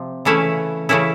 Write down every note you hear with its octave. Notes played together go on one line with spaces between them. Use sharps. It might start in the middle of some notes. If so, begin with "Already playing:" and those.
Already playing: C3 F3
C#3 E3 A3 C#4 E4
C#3 E3 A3 C#4 E4